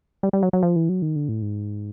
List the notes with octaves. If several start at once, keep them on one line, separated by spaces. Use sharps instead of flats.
G3
G3
F#3
F#3
F3
E3
F#3
D#3
D3
A2
G#2